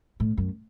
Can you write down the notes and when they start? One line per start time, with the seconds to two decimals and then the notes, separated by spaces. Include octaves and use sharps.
0.20 A2
0.37 F#2